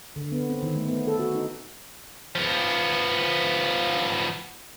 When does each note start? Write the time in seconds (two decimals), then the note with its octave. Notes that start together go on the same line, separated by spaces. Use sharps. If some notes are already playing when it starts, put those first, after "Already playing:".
0.16 D3
0.32 B3
0.49 C4
0.63 D#3
0.76 A3
0.88 B3
1.07 A4
1.19 F#4
1.35 D#4
2.35 F3 B3